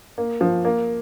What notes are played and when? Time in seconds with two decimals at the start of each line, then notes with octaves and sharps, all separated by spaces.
0.18 A#3
0.41 F3
0.65 A#3